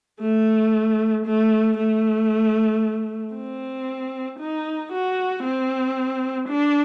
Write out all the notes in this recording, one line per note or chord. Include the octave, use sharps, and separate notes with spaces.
A3
A3
A3
C4
D#4
F#4
C4
D4